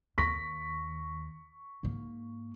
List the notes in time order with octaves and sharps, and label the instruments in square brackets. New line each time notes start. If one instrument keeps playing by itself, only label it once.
[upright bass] D#2 [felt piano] C#6 A#6 B6
[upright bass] G#2 A#3